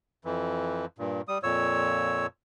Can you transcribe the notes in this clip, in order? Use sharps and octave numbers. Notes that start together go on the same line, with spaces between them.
F2 E3
G2 A#2
G3 D#6
F2 A#2 C#5 E6